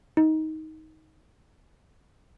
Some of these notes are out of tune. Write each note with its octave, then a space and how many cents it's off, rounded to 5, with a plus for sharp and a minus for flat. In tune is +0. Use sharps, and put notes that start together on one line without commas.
D#4 +15